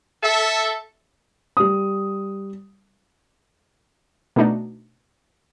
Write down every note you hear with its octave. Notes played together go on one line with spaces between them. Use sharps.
A4 E5
G3 D#6
B2 A3 D4 D#4